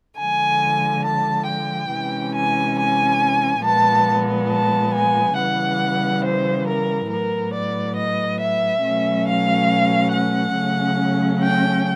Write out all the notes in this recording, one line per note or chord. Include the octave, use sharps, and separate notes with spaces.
D3 F3 G#3 G#5
A5
G5
C3 E3 G#3 C#4
G#5
G#5
A#2 F3 G#3 B3 A5
A5
G#5
C#3 E3 G3 B3 F#5
C5
A#4
A2 F#3 B3 A#4
D5
D#5
E5
B2 F#3 A3 C#4
F5
F#5
C#3 F#3 A3 C#4
G5